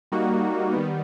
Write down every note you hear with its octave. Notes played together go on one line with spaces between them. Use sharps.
G3 A#3 D#4 F#4
D#3 G3 B3